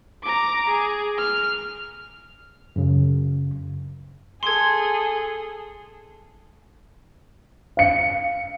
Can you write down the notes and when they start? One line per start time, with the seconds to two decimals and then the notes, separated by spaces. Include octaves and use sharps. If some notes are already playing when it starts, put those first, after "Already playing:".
0.23 A#5 D6
0.69 G#4
1.18 F6
2.76 F#2 C#3
4.43 G#4 A4 C6 G#6
7.77 F5 C#7